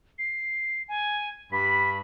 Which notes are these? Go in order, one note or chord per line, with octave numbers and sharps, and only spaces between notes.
C7
G#5
G2 B5 B6